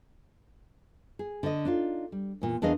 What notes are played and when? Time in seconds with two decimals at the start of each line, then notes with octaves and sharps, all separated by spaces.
1.19 G#4
1.43 D3 D#5
1.65 D4 D#4 F4
2.12 G3
2.42 E2 A#2
2.62 E2 D4 G#4 A#4 D#5 F5